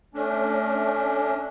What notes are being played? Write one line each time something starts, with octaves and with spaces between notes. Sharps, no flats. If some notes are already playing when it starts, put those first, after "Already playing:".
A3 C#4 D4